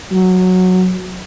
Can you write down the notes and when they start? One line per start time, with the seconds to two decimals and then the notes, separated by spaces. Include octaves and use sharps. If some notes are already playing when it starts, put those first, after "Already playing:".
0.11 F#3